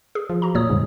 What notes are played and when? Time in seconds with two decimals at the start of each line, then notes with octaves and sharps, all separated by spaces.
0.15 G#4
0.30 F3
0.42 F#4 A#5
0.55 D#1 A#2 A#3 C#5 D#6
0.69 F2 G#2 D3 G3